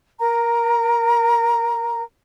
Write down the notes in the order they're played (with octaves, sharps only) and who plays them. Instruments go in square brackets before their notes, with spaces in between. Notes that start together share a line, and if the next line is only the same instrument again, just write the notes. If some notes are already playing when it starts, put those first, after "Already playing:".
[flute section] A#4 A#5